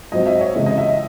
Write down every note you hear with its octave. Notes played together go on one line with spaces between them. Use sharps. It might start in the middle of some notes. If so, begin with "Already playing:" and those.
G#2 F#3 C4 D#5
E5
C#5
C#2 C3 E3 G#3
D#5
E5